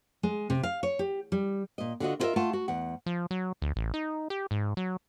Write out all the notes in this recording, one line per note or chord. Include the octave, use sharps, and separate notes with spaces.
G#3
C3
F5
C#5
G4
G3
A#2 D#5
D3 F4 F#4 D#5
E4 F4 A#4 B4 D#5 E5
A3 F4 F5 F#5 A5
F#4
E2 F#5
F3
F#3
D2
A1
D#4
G4
G#2
F#3